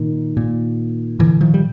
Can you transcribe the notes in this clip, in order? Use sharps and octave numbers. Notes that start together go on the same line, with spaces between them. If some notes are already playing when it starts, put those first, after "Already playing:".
Already playing: A#2 D#3
A#2
A#2 D3 E3
D#3 F3
G3